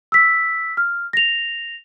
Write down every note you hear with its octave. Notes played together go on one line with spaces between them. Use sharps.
E6 B6
F6
A#6 F7